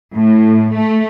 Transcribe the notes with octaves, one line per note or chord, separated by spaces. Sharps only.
A2
A3